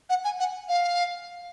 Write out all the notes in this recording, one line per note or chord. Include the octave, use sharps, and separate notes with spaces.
F#5
G#5
F#5
F5